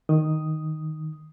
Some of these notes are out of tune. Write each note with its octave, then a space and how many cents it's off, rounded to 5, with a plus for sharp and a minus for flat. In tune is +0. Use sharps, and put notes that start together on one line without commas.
D#3 +0 D#6 +0